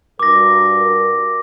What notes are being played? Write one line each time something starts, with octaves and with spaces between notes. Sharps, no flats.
G2 F#4 A#4 D6 A#6